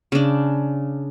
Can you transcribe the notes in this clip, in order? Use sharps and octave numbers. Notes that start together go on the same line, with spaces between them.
C#3 D4